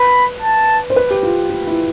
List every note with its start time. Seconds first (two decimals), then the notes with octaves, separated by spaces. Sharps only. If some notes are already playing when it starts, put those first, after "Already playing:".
Already playing: B4 B5
0.42 A5
0.90 C5
0.96 B4
1.10 G4
1.23 F4
1.49 F4
1.67 E4